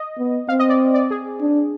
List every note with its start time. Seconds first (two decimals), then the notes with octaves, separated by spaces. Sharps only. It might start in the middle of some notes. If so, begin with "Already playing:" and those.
Already playing: D#5
0.18 B3
0.49 C4 F5
0.59 D#5
0.69 D5
0.94 D5
1.11 G#4
1.41 D4